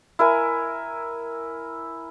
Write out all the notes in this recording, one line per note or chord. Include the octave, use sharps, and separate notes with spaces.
E4 A#4 G#5